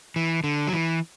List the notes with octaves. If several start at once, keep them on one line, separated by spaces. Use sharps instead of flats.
E3
D3
F#3
E3